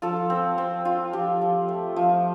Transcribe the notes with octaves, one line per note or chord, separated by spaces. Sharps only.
F3 F4 A4
C4
C4
F4
F3 G4
F3
A3
F3